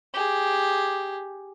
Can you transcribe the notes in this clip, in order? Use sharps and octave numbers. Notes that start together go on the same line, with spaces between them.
G4 G#4